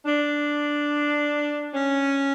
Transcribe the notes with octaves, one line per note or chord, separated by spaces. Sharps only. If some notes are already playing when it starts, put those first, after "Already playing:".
D4
C#4